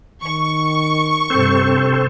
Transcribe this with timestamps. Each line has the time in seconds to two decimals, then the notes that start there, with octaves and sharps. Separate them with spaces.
0.23 D#3 C#6
1.30 G2 C3 C4 A4 C5